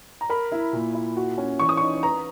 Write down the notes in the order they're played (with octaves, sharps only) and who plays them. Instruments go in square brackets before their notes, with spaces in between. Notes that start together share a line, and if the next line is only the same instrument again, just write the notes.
[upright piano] A#5
[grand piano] A#4 [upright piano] B5
[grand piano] E4
A#2
E4
F#4
C#4
[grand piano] E3 [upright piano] C#6
[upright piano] D#6
[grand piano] D#4 [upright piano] C#6
[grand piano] B4 [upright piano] A#5